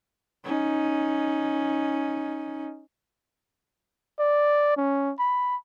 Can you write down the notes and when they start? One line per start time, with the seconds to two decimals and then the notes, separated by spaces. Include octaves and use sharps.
0.44 C#4 D#4
4.19 D5
4.77 C#4
5.19 B5